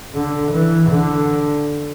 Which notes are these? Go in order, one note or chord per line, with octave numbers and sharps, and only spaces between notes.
D3
E3
D3